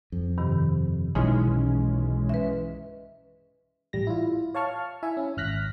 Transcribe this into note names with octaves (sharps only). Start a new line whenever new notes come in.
F2
G2 C3 D#3
B1 E3 G#3 C#4 D#4 F4
B4 E5
A1 G3 A#6
E4 F4
C#5 F5 A5 C#6 F6
E4 E5 G#5
C#4
G#1 F6 F#6 A#6 B6